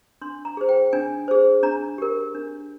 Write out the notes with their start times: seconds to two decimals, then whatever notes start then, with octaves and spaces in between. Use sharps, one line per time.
0.21 D4 C6
0.45 A#5
0.57 G#4 C5
0.69 G5
0.93 D4 G#5
1.28 G#4 C5
1.63 D4 A#5
1.98 G4 A#4
2.34 D4